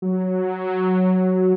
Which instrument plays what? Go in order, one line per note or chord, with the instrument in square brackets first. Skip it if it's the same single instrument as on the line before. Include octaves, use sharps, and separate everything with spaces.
[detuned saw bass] F#3